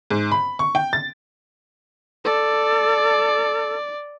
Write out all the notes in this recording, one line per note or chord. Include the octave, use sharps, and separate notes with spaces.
G#2
B5
C#6
G5
A6
A4 D5